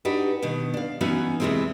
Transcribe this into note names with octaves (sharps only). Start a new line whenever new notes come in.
D4 D#4 F#4 G4 B4
B2 D#3
D4 F5
E3 B3 C#4 D#4 F#4
E2 C3 D#3 E3 G#3 C4